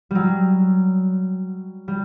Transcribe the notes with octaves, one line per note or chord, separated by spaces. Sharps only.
F#3 G3
G3